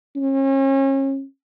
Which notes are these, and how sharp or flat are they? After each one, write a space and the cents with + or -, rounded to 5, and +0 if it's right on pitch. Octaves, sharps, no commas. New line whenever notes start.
C#4 -35